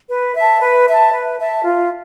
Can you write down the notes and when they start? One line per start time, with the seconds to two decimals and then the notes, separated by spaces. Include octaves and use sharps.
0.10 B4
0.36 E5 A5
0.62 B4
0.88 E5 A5
1.13 B4
1.39 E5 A5
1.64 F4